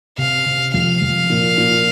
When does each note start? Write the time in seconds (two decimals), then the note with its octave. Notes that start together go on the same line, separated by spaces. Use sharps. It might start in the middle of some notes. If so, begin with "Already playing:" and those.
0.18 C3 F5
0.46 C3
0.74 F2 F5
1.02 F2
1.30 A#2
1.58 A#2